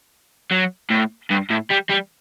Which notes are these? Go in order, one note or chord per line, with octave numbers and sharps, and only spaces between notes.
F#3
A2
G2
A2
G3
G3